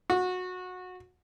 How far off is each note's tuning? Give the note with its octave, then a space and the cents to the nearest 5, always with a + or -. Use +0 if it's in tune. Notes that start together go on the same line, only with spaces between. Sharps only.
F#4 -20